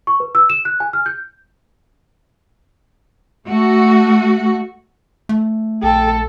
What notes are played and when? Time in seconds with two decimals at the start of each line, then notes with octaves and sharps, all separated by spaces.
0.07 C#6
0.20 B4
0.35 E6
0.50 E7
0.65 F#6
0.80 G#5
0.93 F6
1.06 G6
3.48 A3 F#4
5.29 A3
5.83 A#1 A4 G5